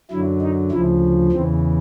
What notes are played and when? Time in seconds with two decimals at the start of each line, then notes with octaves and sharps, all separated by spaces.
0.11 F#2 D3 F#3 E4
0.41 D#4
0.71 D2 C#3 F3 E4
1.32 E2 C#3 E3 C4